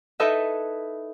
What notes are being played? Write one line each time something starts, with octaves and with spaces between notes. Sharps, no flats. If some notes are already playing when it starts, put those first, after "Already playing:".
D#4 E4 A4 B4 D#5 E5